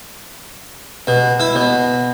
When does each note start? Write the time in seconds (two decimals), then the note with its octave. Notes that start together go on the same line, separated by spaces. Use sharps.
1.07 B2
1.40 E4
1.55 B2